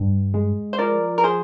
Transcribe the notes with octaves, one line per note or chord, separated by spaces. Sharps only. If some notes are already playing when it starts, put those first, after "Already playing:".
Already playing: G2
G#3
C5
F3 A#4 D5
A#4
G#4 C5